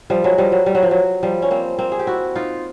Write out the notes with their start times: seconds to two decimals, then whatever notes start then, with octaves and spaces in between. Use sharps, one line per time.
0.10 F3 G3
0.24 F#3 G#3
0.38 F3 G3
0.52 F#3
0.66 G3
0.75 F#3
0.83 F3
0.91 F#3
1.23 F3 G3
1.42 C#4
1.51 A#3 C4
1.78 A#3 C4
1.92 G#4
1.99 G4
2.07 E4 F#4
2.36 D#4 F4